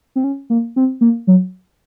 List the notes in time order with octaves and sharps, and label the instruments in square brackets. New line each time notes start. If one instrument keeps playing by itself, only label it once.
[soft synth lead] C4
C#4
A#3
C4
A#3
F#3